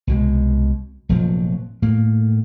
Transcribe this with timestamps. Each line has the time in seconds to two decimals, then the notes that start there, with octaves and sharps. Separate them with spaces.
0.07 C2 B2 G#3
1.09 F1 A#2 F3 F#3
1.82 A2 A#3